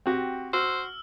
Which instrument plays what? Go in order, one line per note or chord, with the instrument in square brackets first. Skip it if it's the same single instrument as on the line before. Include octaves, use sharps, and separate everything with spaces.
[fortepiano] C4 F#4 G4
[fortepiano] F#4 [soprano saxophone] C5 [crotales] E6 F6